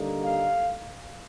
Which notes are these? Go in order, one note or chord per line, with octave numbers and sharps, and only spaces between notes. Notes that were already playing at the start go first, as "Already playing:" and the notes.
Already playing: D3 G3 A#3 D#4
F5